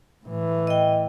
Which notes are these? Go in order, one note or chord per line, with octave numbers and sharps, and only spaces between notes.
A2 E3
D#5 G5